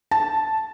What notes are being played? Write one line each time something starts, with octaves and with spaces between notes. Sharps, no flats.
A5